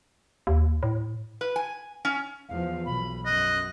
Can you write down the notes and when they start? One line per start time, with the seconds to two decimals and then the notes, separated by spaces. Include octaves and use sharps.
0.47 D#2
0.83 A2
1.41 B4
1.56 G#5
2.05 C#4
2.49 E2 F3 F5
2.86 B1 B5
3.25 F#2 D#5 F#6